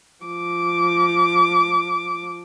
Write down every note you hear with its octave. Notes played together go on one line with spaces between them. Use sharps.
F3 D6